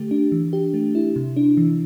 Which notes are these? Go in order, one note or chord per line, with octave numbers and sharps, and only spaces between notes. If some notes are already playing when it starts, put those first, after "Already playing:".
Already playing: D3 A3 G4
D4
E3
G4
A3
E4
C3
D4
E3